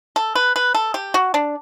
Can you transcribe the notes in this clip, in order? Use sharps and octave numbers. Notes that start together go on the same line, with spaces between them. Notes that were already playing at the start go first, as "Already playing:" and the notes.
A4
B4
B4
A4
G4
F#4
D4